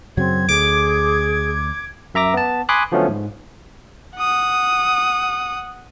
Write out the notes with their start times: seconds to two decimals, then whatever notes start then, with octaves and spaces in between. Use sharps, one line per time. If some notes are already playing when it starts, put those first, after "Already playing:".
0.17 F#2 C#3 F#3 C4 G#6
0.49 D2 G#4 D6
2.15 F#2 E5 A#5 D6 A#6
2.34 B3 A5
2.69 G#5 B5 C6 D6 D#6 F#6
2.92 D3 F3 F#3 A3 B3 C#4
3.08 G#2
4.17 F#5 D#6